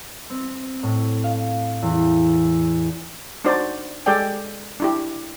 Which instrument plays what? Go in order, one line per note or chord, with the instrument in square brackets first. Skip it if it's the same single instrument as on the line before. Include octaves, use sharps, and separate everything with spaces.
[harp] C4
A2
F5
E2
[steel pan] D4 D#4 F#4 C5 D5
G#3 G4 A4 D5 G5 G#5
D4 E4 G4